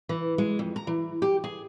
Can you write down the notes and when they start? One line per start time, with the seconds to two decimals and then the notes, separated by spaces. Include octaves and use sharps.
0.09 E3
0.38 G#3
0.59 F2
0.76 A#5
0.87 E3
1.22 G4
1.44 G#4